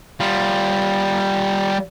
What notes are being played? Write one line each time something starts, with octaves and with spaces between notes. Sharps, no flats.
G3 F4